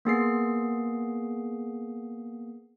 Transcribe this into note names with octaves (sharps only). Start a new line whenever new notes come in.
A#3 B3 G#4 C7